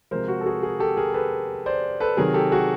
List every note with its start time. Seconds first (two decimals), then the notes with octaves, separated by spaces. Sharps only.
0.11 C3 F3 G#3 A#4 C5
0.28 F#4
0.41 A4
0.46 F#4 G#4
0.63 G#4 A#4
0.80 G4 A4
0.97 G#4 A#4
1.14 A4 B4
1.66 C5 D5
2.00 A4 B4
2.17 C3 D#3 F#3 G#4 A#4
2.34 G4 A4
2.52 F#4 G#4